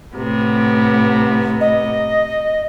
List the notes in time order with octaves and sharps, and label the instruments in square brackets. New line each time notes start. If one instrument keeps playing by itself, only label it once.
[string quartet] A2 C3 B3
[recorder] D#5